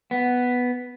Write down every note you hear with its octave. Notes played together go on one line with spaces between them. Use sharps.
B3